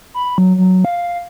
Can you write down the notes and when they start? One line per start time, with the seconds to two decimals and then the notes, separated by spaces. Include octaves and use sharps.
0.14 B5
0.38 F#3
0.58 F#3
0.85 F5